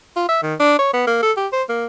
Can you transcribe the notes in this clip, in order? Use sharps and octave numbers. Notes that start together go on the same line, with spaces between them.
F4
E5
D#3
D4
C#5
B3
A#3
A4
G4
C5
A#3